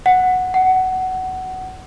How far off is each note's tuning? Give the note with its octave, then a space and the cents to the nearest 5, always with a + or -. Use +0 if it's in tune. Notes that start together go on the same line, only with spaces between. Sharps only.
F#5 -5
F#5 +15